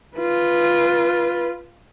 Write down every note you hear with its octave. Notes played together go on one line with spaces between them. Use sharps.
F4 B4